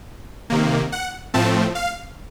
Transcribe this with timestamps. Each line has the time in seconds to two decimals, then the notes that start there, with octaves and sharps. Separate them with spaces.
0.50 C3 D#3 A#3
0.92 F#5
1.34 A2 F3 A3 C4 A5
1.75 F5